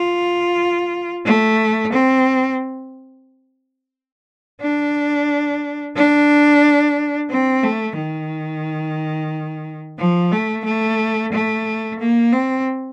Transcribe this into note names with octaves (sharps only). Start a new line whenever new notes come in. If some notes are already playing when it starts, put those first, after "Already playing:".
Already playing: F4
A3
C4
D4
D4
C4
A3
D#3
F3
A3
A3
A3
A#3
C4